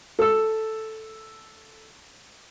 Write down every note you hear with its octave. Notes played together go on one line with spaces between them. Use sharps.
A4 E6